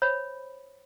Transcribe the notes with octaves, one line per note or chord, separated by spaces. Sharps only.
C5 C#5 B5